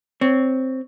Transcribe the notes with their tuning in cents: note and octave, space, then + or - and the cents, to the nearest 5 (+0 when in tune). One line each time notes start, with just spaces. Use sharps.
C4 +0 C#5 +10